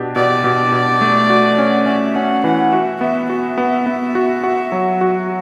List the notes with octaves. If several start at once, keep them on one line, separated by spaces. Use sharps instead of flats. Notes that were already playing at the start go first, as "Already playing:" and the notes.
Already playing: B2 D4 G4
B2 D5
B2
B2
A3
F#4
C#4
C#4 E5
C#4 F#5
E3 F#5
F#4 E5
B3 E5
F#4 E5
B3
B3
F#4
F#4
F#3
F#4